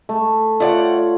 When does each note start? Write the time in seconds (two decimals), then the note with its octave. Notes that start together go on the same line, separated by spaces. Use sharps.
0.09 A3
0.60 A3 F4 C#5 D5 F#5